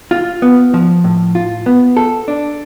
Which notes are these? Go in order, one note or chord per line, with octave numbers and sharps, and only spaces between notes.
F4
B3
F3
A2
F4
B3
A4
D4